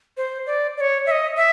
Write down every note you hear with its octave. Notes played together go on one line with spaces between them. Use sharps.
C5
D5
D5
C#5
E5
D#5
E5